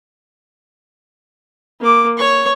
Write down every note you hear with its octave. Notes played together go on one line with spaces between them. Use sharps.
A#3 D6
C#5 C#6